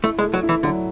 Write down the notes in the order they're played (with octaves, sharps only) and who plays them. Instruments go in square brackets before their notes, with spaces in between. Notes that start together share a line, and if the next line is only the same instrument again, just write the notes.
[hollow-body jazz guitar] A3 [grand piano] E4
[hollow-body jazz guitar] G#3
[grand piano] A3
[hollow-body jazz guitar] F#3
[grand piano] E4
[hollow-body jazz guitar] E3
[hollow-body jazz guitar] D3 [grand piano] F#3